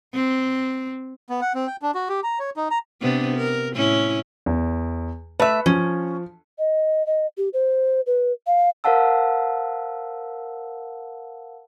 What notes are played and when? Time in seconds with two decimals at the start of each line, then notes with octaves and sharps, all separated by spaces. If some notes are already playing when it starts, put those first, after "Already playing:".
0.14 C4
1.30 B3
1.41 F#5
1.55 C4
1.67 G5
1.82 D4
1.95 F#4
2.09 G4
2.23 A#5
2.39 C#5
2.57 D#4
2.71 A#5
3.01 C3 B3 D4
3.37 A#4
3.74 A2 C#4 E4
4.46 E2
5.40 A3 B4 E5
5.66 F3 C#4
6.59 D#5
7.07 D#5
7.38 G4
7.53 C5
8.06 B4
8.47 F5
8.84 A#4 C5 F5 F#5 A5 E6